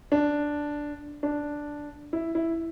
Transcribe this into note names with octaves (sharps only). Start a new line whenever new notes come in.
D4
D4
E4
E4